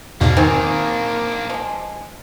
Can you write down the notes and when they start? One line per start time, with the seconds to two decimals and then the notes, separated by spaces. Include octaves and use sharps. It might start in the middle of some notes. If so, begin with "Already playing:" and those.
0.21 E2 G#2 B2 A#3 D4
0.37 D#3 C4 G#4
1.50 F3 G#3